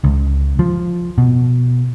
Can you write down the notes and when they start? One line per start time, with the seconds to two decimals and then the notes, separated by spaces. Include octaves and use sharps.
0.04 C#2
0.59 F3
1.18 B2